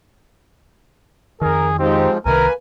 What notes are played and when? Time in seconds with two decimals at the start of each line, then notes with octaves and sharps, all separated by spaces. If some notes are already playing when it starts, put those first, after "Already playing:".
1.42 F2 D#3 G#4 A#4
1.79 G#2 F3 C4 D#4 G4
2.26 C2 C3 D#3 A3 A#3 A#4 B4 G#5